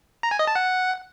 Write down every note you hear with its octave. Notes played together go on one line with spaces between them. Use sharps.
A#5
G#5
D#5
A5
F#5